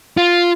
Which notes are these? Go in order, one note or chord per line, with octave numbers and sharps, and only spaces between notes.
F4